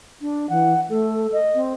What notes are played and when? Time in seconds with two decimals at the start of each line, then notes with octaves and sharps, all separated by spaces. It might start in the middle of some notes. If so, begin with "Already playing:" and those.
0.21 D4
0.49 E3 F#5
0.90 A3 A4
1.32 D#5
1.54 C4